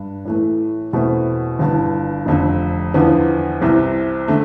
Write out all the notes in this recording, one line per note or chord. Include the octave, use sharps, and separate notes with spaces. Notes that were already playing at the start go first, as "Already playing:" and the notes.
Already playing: G2
A2 E3 A3
E2 B2 A3 C4 E4
G1 G2 E3
F1 F2 D3
E2 D3 F3 B3
C2 C3 E3
D3 A3